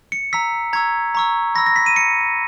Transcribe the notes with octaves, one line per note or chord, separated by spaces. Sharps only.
C#7
A#5 E6 B6
A#5 C#6 E6 G#6
A#5 C#6 E6
B5 E6 A#6
A#6
B6
D#7
C#7